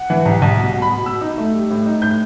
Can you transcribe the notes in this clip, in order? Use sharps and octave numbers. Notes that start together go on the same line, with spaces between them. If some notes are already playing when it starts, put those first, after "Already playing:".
Already playing: F#5
E3
C2
C2
B2
B2
B5
B2
B2 E6
D#4
A3
G3
A2
D#4
A2 G6